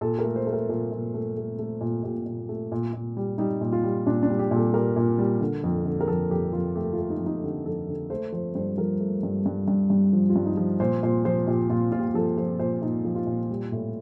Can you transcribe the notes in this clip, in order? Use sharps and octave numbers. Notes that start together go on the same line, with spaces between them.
A#2 A4
A#4
A3
C5
A3
A#4
A#2 A4
A#2
A3
A3
A3
A#2
A#2 G4
A#2
A3
A#2
A#2
G3
G3 D#4
A#2
F4
G3
A#2 D4
D4
G3
G4
A#2 A4
G3 A#4
A#2
G3
D3
F2
D3
A#4
F2 A4
F2 G4
F2 F4
A3 G4
F4
A3
D#4
F2
D#4
D3 G4
F2 A4
D3
A3 C5
F3 C5
G2 C5
F3 A#4
A3
G2
G2
G2
G2
F3
F4
G2
D#4
F3
A#2 C5
A#2 C5
F3 C5
A#2 G4
A#2 F4
A#2 F4
G4
F4
F3 A4
F3 C5
A#2 C5
A#2 D#4
F3
F4
A#2
G3
A2